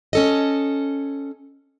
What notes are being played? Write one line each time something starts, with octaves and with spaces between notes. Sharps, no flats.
C#4 A4 D#5